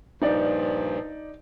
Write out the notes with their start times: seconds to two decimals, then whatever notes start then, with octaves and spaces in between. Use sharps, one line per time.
0.22 G2 A#2 F3 D#4 D5